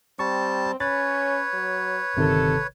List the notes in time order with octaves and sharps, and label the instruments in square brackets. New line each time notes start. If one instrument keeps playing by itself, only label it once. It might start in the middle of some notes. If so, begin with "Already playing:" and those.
[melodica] G3 A5 [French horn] C4 [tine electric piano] C#6
[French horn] C#4 [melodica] B4 C#5 [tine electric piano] B5 A6
[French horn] F#3
[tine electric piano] G1 C3 D#3 [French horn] A4